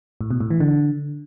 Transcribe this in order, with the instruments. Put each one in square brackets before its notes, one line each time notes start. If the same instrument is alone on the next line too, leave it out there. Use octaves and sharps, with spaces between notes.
[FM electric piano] A2
B2
A2
E3
D3